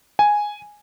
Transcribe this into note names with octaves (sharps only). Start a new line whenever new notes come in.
G#5